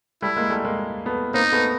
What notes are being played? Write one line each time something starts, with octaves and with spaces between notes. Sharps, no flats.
G3 A3 E4
G#3 A#3
G3 A3
G#3 A#3
A3 B3
A#3 C4 D#4
A3 B3